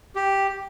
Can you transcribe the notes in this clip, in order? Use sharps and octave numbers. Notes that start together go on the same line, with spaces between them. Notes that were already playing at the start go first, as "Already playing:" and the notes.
G4